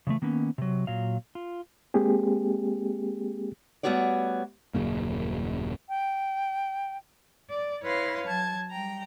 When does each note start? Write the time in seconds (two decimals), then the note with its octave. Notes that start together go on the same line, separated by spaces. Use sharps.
0.07 C#3 E3 G3 A3
0.22 D#3 A#3 B3 C#4
0.58 C3 F#3
0.87 A#2 F#3 F5
1.35 F4
1.94 G#3 A#3 C4 G4 G#4
3.83 G3 A3 B3 F#4 C#5 D5
4.74 D#1 F#2 C#3 A#3
5.89 G5
7.49 D5
7.82 E4 B4 C#5 F5 C6 A#6
8.27 F#3 A5 G#6
8.71 G3 G5 A#5